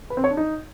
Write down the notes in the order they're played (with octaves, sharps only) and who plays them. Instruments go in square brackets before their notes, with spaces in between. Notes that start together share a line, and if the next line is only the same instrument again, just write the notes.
[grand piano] B4
C4
C#5
D4
D#4